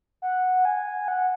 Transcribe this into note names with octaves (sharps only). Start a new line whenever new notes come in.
F#5
G#5
F#5